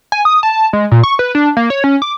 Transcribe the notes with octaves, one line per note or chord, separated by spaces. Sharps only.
G#5
D#6
A5
G#3
A#2
C#6
B4
D4
A#3
C#5
C#4
D6